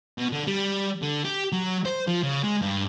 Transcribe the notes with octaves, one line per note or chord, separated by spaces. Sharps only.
B2
D3
G3
D3
G4
F#3
C5
F3
C#3
G#3
G2